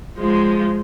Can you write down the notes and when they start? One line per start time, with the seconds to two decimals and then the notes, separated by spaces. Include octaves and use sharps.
0.18 F3 G#3